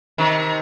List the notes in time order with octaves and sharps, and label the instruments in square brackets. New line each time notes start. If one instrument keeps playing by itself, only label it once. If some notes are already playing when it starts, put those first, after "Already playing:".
[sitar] C3 D#3